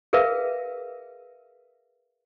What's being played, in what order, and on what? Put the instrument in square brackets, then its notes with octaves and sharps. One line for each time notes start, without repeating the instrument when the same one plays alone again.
[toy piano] G#4 A#4 B4 E5 F5